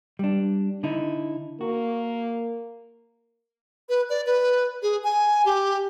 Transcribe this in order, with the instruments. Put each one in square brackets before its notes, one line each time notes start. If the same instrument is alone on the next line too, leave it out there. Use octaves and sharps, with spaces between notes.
[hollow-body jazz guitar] G3 D4
D3 D#4 E4
[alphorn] A#3 [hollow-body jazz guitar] F#4
[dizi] B4
D5
B4
G#4
G#5
G4